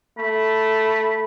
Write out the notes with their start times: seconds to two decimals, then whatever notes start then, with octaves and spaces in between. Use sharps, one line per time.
0.18 A3 B5